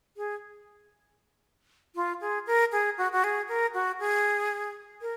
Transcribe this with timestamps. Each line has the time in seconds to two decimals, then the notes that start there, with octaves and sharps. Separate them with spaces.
0.17 G#4
1.95 F4
2.21 G#4
2.47 A#4
2.72 G#4
2.98 F#4
3.12 F#4
3.24 G#4
3.49 A#4
3.74 F#4
3.99 G#4
5.02 A#4